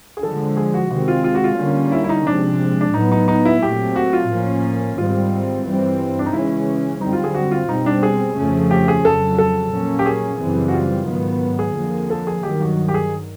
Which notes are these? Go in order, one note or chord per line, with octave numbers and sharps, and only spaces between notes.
G#4
D3 F3 G#3 A4
G#4
F#4
C3 D#3 G#3 C4 F#4
F4
F4
F#4
F4
D3 G3 A#3 C#4
E4
E4
D#4
C3 F3 G#3 D4
D4
A2 F#3 B3 D#4
D#4
D#4
E4
A#2 F#3 A3 C4 G4
F#4
F4
A2 F3 A#3 C#4
G#2 D#3 G3 C4 F4
G2 E3 G3 C4
D4
D#4
C#3 E3 G#3 C#4 E4
F#2 D3 G3 C4 D#4
F4
G#4
F#4
F4
B2 G3 C4 D#4
D4
G#4
F2 C#3 F3 A3 C#4
G4
G#4
F2 C#3 F#3 A4
A4
A#2 F#3 A#3 C#4
G4
G#4
F#2 C#3 E3 G3 C4
F#4
F4
G#2 D#3 F#3 B3
G#4
F2 D3 F3 A#3
A4
G#4
G2 D#3 F#3 G4
F#4
G4
G#4